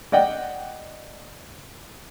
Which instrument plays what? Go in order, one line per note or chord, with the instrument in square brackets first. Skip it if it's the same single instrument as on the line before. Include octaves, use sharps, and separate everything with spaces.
[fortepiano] D5 D#5 F#5 G5